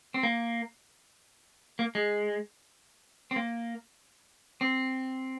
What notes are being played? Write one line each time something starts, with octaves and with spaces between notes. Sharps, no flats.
C4
A#3
A#3
G#3
C4
A#3
C4